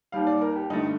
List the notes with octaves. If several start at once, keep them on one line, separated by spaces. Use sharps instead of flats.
D#2 D#3 G3 F5
D5
A#4
G4
G2 D3 A3 D#4